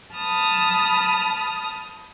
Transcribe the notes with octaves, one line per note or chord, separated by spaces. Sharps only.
A5 B5 D#6 F6